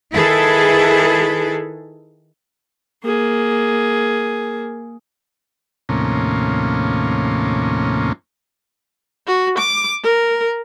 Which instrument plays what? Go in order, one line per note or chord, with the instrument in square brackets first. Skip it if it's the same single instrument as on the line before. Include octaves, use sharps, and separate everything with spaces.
[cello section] D#3 E4 G#4 A4 B4
[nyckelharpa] A#3 G#4
[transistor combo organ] D#2 A2 C3 F3 A#3 C#4
[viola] F#4
D6
A#4